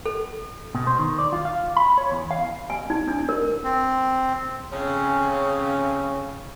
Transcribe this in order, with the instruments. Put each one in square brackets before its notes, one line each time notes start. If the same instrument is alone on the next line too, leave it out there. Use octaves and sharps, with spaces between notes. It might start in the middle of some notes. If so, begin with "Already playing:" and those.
[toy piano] A4
[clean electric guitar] B2
C5
D#3
D5
F4
F5
B5
C#5
E2
F5
[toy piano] G#5
D#4
D4
A#4
[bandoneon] C4
[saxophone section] F2 C#3 [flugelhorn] C#4